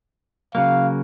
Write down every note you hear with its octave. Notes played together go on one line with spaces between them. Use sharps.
C#3 F#3 A#3 F5